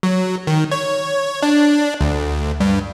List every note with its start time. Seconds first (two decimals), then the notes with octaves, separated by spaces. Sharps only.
0.03 F#3
0.47 D#3
0.72 C#5
1.43 D4
2.01 D2
2.60 G2